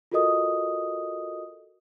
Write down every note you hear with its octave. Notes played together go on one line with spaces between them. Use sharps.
F4 F#4 A4 A#4 D#5 D#6